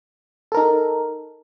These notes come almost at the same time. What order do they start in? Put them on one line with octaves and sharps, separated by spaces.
A4 A#4 D#4